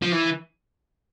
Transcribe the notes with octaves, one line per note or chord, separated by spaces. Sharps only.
F3
E3